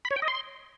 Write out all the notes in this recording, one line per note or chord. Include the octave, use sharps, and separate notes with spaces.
B5
C#5
G5
D#5
C6